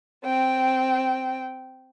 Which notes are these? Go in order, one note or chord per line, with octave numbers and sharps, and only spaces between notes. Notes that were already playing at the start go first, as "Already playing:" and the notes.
C4 G5